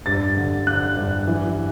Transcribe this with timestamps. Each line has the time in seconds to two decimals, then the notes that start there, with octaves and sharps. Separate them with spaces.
0.06 G2 A6
0.37 D3
0.67 D3 F#6
0.97 G2
1.27 E3